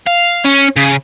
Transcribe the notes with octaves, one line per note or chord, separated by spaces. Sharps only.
F5
C#4
C#3